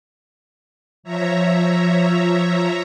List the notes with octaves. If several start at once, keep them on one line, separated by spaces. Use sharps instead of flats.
F3 C#5 E5 A#5